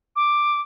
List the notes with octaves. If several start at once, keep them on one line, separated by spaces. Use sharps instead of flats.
D6